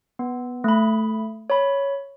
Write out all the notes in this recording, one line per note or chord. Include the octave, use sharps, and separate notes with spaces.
B3
A3 B5
C#5 B5